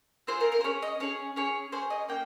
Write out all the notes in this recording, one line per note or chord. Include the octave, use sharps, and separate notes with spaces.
C4 F4 G#4 C5
A#4
A#4
C5
C#4 G#4 C#5
D#5
C#4 G#4 C#5
C#4 G#4 C#5
C#4 G#4 C5
D#5
A#3 C#4 G5